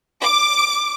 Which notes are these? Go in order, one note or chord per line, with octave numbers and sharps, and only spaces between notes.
D6